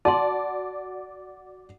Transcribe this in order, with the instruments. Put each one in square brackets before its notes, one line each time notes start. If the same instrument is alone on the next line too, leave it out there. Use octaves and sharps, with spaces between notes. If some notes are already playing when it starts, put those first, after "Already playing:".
[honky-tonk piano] F#4 D5 [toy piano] A5 C6